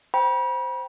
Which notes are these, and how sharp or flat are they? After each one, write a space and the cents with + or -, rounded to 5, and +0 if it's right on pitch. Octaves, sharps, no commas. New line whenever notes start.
C5 +0 G5 +0 B5 -40